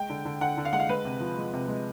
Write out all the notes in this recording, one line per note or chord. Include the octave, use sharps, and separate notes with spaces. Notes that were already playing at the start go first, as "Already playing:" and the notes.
Already playing: G#3 G5
D3
D3
D3 F#5
D3
F5
G#3 F#5
F5
G#3 B4
C3
F3
G#3
C3
G#3